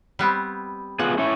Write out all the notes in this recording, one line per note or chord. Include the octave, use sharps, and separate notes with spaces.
G3 B3 C4
B3 F4 G#4 F#5
C#4 E4 C#5